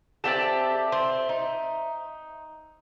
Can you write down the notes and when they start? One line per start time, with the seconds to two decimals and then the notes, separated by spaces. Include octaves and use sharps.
0.24 C4 G4 A4 D5 E5 A5
0.92 C4
1.29 D#4